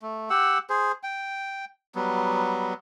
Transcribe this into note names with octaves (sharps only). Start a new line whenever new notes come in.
A3
G4 F#5 E6
G#4 C5
G5
F#3 G3 B3